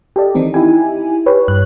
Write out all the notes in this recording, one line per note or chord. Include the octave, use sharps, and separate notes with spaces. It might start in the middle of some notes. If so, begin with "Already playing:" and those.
G4 A4 D5 D#5
D#3 E3 C4 D#4
D#4 E4 G4 G#5
G4 B4 C#5
G2 C#5 F#6